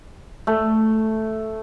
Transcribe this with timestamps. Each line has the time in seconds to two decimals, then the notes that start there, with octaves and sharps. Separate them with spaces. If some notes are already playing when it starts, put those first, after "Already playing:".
0.47 A3